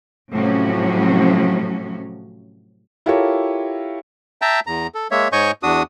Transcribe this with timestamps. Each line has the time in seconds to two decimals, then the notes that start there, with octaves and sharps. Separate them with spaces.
0.32 A2 C3 F3 F#3 C#4 F#4
3.06 E4 F4 G4 A4 A#4 C#5
4.42 E5 G5 A5 A#5
4.67 E2 A#5
4.95 A4
5.11 G#3 A#3 C#5 E5
5.32 G#2 C#5 D#5 G#5 C#6 G6
5.63 E2 D4 F#4 D#6